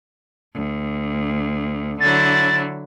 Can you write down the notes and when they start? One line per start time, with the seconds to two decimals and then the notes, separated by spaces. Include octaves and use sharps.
0.56 D2
2.00 D3 F#3 E4 A6